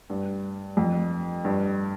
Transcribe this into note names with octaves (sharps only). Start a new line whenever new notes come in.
G2
F2
G2